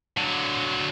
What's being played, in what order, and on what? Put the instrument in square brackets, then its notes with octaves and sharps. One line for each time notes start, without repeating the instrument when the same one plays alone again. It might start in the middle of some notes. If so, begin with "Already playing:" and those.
[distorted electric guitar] D3 F#3